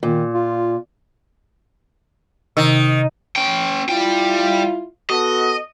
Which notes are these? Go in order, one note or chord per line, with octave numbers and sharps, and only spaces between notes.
A#2 D#3
F4
C3 D#3
C#4 G5
G3 E4 F4 G5
B3 F#4 A4 D#5